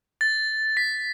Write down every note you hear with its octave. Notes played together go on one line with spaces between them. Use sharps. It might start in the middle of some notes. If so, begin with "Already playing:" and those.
A6
B6